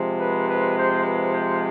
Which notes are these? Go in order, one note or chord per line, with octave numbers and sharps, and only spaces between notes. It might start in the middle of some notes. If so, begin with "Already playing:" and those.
Already playing: C3 F3 G#3
B4
B4
C5
B4
C5